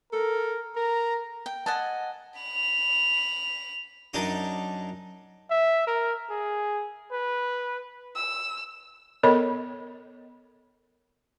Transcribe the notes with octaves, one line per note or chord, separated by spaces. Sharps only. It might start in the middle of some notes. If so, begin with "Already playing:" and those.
A4 A#4
A#4 A#5
G5
D#5 F#5 G#5 A5
B5 F7
F#2 D4 D#4 D6 D#6
E5
A#4
G#4
B4
E6
B3 A4 A#4 C#5 D#5 B5